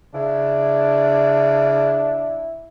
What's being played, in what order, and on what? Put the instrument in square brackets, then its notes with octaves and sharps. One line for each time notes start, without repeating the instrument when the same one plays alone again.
[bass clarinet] C#3 [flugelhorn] D4 [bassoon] E4